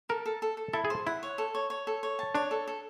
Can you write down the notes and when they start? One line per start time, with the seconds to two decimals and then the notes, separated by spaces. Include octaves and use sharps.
0.09 A4 A#4
0.26 A4
0.42 A4
0.57 A4
0.73 E4 A4
0.85 G#4
0.90 C5
1.06 E4 F#5
1.23 C#5
1.38 A4
1.55 C#5
1.70 C#5
1.87 A4
2.03 C#5
2.19 A5
2.35 D4 C#5
2.51 A4
2.68 A4